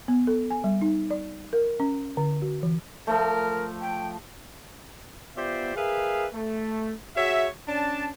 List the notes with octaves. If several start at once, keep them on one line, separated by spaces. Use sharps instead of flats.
B3
A4
G#5
G3
D#4
D5
A#4
C#4
D3
F#4
E3
F3 A3 A#4
G5
B3 F4 G4 C5 D5 E5
G#4 A#4 B4 E5 F5
A3
F#4 G#4 C#5 E5
C#4 D4 A5